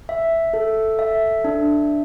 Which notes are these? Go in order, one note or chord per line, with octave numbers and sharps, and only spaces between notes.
E5
A4
E5
D4